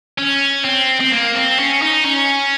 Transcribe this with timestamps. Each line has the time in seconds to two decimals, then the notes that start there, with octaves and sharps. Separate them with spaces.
0.18 C#4
0.64 C4
1.00 C4
1.12 A#3
1.35 C4
1.59 C#4
1.82 D#4
2.05 C#4